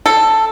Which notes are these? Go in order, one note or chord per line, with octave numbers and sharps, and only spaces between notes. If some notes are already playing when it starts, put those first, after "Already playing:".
A4